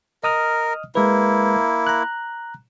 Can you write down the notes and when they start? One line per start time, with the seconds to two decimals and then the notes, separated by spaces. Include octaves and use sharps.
0.23 A#4 D#5 D#6 F6
0.95 G#3 A#3 E4 B4
1.87 A#5 F#6